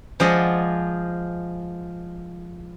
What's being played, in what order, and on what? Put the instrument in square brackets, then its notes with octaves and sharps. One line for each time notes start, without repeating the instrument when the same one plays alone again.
[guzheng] F3 G#3 G#4 D5 D#5 F#5